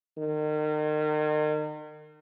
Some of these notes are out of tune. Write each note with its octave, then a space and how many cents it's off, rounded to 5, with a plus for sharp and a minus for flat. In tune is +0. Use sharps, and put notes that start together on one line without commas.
D#3 -35